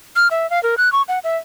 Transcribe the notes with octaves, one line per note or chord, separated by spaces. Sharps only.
F6
E5
F5
A#4
F#6
C#6
F#5
E5